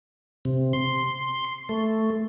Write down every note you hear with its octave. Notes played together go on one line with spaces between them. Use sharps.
C3
C6
A3